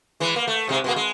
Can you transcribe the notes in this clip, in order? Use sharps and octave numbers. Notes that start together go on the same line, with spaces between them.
E3 G#3
A#3
A3
G#2 C3 G#3
B2 G#3 A#3
G#3